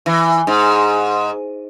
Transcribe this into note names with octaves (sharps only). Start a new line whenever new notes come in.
E3
G#2